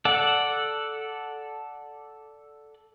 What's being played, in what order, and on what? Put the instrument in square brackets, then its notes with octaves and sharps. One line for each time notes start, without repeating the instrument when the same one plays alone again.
[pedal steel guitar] A4 D5 F#5